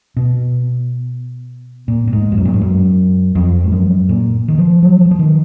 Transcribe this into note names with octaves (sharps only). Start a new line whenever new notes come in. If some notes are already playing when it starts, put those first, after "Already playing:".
B2
A#2
A#2
G#2
F2
F#2
A#2
G#2
F#2
F2
G#2
F#2
A#2
D#3
F3
F#3
F3
F3
D#3